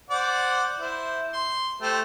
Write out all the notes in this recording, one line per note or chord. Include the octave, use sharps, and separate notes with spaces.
C5 D5 F#5
E4 C5
C6
A3 G4 C5